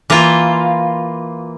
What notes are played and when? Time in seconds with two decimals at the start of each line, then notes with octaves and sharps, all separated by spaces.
0.10 E3 A#3 F4